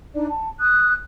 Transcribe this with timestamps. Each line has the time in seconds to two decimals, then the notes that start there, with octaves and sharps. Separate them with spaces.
0.14 D4 D#4 D5
0.29 A5
0.60 D#6 F#6